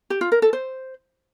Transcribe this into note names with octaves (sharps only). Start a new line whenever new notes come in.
G4
F4
A#4
A4
C5